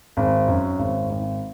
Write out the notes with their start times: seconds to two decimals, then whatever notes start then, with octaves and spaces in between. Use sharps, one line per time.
0.17 G#1
0.48 F#2
0.79 G#1
1.10 G#1